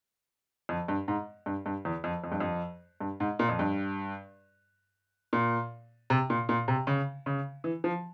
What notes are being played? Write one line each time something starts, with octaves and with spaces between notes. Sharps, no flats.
F2
G2
G#2
G2
G2
E2
F2
F2
G2
F2
G2
G#2
A#2
F2
G2
A#2
C3
A#2
A#2
C3
C#3
C#3
E3
F3